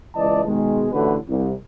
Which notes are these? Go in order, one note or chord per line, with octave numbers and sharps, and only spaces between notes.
C#2 E3 D5 D#5 A5
B2 D#3 G#3
A1 A2 D3 F#4 B4
C2